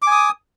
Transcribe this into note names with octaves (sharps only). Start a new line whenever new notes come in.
G#5 D6 D#6